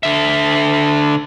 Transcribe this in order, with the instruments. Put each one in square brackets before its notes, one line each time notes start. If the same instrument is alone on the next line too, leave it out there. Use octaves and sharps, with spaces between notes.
[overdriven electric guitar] D3 E5